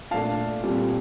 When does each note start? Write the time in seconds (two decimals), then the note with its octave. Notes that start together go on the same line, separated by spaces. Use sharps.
0.11 A#2 A3 D4 F5 A5
0.63 A#2 G3 C4